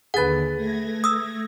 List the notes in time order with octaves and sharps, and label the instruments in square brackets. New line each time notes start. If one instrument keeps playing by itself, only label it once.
[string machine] D#2 D3 [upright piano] G#4 B4 [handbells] F#5 A6
[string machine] A3 G#6 A#6
[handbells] D#6 E6